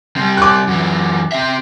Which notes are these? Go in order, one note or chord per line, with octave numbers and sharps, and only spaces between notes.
C3 G3
D6 F#6
F#2 E3
C4 E5